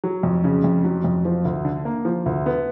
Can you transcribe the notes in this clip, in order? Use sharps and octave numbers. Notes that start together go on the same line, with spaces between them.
F#3
F2
C#3
F2
F#3
F2
F3
D2
D3
A#3
F3
D2
B3